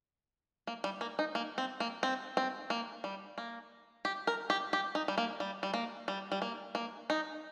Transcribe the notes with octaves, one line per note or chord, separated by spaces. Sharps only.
A#3
G3
A#3
D#4
A#3
C4
A#3
C4
C4
A#3
G3
A#3
G4
A#4
G4
G4
D#4
G3
A#3
G3
G3
A#3
G3
G3
A#3
A#3
D#4